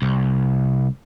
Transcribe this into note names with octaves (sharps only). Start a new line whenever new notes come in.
C2